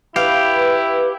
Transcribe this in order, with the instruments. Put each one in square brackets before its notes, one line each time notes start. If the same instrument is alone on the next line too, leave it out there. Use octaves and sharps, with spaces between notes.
[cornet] E4 [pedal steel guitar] G4 [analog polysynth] B4 [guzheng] F5